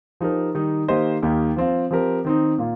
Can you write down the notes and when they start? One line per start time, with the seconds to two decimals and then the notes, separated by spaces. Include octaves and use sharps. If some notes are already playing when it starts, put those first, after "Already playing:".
0.21 F3 D#4 G4 A#4
0.55 D#3 G3 D#4
0.88 D#3 A#3 G4 C5 D#5
1.22 D#2 D#3 A#3 D#4 G4
1.56 F3 C4 F4
1.91 F3 C4 G4 A#4
2.25 D#3 C4 D#4
2.58 A#2 A#3 F4